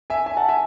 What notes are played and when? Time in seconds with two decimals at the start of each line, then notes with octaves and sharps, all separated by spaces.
0.10 E5 G#5
0.26 E5 G#5
0.37 F#5 A5
0.49 E5 G#5